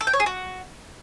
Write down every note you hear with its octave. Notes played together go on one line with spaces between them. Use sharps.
A4
G5
C#5
G#4
F#4